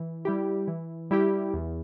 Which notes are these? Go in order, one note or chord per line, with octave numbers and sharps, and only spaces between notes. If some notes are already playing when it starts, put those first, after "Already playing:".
Already playing: E3
G3 E4 G4
E3
G3 E4 G4
E2